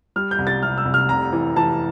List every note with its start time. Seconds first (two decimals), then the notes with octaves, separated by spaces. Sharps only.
0.16 G3 F6
0.31 G6
0.39 C2
0.47 A6
0.63 C3 F6
0.78 E6
0.86 C2
0.94 F6
1.09 F1 A#5
1.32 E3
1.56 E3 A5